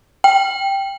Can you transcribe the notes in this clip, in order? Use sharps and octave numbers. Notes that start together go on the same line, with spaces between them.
G5